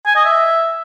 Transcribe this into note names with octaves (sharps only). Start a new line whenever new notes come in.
G#5
D#5
E5